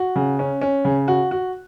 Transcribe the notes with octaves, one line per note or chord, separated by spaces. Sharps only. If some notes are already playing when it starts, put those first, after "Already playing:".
Already playing: F#4
C#3
C#4
C#4
C#3
F#4
F#4